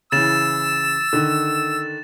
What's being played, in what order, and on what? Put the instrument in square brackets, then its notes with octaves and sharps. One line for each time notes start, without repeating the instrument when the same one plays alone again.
[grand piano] C#3 E3 [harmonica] E6 [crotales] A6 E7
[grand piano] D3 D#3